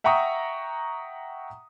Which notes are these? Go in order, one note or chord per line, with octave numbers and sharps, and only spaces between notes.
E5 F#5 G5 A#5 C#6 D#6